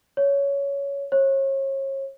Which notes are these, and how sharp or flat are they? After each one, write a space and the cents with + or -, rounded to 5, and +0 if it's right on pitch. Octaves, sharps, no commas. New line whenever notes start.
C#5 +15
C#5 -35